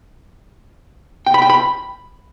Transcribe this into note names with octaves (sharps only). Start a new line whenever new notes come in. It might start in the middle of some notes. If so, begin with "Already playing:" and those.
G5
B5
G5
B5